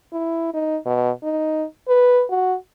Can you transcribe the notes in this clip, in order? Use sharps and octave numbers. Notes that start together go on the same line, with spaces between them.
E4
D#4
B2
D#4
B4
F#4